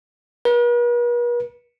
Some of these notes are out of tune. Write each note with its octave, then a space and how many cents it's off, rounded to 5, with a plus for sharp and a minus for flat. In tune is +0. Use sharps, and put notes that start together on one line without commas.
B4 -45